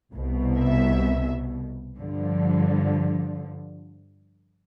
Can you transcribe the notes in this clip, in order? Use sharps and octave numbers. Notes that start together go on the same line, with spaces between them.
C2 B2
E5
G2 D3 F3